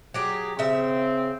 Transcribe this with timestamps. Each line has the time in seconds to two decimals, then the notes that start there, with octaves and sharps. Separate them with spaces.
0.14 F#3 G4 G#4
0.59 C#3 C4 E5